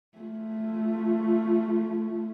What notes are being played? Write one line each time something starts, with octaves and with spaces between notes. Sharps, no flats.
A3 F4